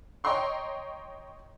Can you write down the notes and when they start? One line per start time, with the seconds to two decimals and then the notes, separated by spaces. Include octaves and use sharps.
0.24 C#5 D#5 G5 A#5 C6 C#6